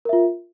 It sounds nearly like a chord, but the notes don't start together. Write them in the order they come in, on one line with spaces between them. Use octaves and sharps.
A#4 E5 F4